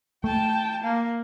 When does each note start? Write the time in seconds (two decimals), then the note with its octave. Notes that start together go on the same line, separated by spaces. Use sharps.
0.24 A3 G5 A5
0.83 A#3